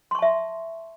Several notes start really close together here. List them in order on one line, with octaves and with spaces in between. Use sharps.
C6 C#6 A5 E5